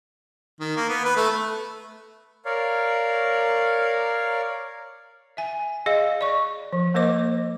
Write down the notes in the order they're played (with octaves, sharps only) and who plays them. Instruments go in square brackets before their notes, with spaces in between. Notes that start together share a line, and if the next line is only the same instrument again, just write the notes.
[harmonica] D#3
A#3
B3
B4
A3
[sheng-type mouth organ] A#4 C#5 D5 F5
[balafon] E5 G#5
G#4 D#5 F5
D5 C#6
F3
A#3 A#4 C5 D#5 D6